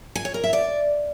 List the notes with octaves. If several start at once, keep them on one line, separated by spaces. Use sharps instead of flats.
G#5
C#5
A#4
E5
D5